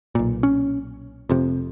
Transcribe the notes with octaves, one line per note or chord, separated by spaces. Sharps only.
B1 A#2
C#4
F1 F2 C3